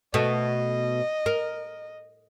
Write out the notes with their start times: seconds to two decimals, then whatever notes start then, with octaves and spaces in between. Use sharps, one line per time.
0.14 B2 A3 D#5
1.26 A#4